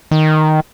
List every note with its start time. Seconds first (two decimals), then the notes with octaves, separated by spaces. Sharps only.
0.11 D#3